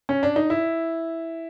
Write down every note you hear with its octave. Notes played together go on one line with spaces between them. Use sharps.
C#4
D4
D#4
E4